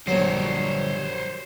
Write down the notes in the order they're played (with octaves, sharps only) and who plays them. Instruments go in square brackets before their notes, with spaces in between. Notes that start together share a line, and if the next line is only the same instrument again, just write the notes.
[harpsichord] A#1 F#3 [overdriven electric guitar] D3 G3 [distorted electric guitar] C5 C#5